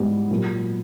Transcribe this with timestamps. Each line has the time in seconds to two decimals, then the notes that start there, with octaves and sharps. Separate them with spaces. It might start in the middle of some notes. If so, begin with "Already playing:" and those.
Already playing: G#2 E3 G3 B3
0.31 A#2 F#3 B3